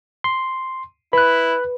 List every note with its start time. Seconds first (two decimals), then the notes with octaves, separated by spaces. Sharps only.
0.24 C6
1.13 E4 B4 B5 F#6